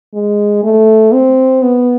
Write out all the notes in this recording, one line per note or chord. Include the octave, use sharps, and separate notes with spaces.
G#3
A3
C4
B3